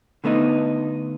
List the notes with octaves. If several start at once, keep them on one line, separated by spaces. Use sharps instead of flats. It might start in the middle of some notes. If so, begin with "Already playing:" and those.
D3 A3 B3 D#4